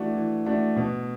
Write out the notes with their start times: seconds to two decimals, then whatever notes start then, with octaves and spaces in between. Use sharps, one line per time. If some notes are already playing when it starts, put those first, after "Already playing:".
Already playing: E3 A3 D4 F#4
0.15 E3
0.46 A3 D4 F#4
0.76 B2